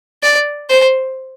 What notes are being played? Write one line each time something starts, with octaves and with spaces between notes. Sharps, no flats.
D5
C5